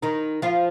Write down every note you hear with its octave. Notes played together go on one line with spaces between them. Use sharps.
D#3 D#4
F3 F4